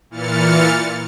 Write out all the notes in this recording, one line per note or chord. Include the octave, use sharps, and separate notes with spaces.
A#2 E3 F6 A6 C#7